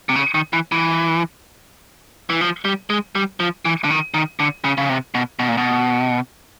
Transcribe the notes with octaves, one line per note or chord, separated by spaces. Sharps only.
C3
C#3
D#3
E3
E3
E3
F3
G3
G#3
G3
F3
E3
D3
D#3
D#3
D3
C#3
C#3
C3
B2
B2
A#2
B2